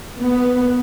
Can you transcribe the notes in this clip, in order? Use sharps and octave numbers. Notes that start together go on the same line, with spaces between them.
B3